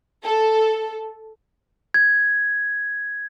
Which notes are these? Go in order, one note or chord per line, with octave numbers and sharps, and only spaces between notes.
A4
G#6